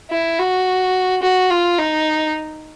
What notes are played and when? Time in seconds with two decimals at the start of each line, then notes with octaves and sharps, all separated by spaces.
0.10 E4
0.39 F#4
1.22 F#4
1.50 F4
1.79 D#4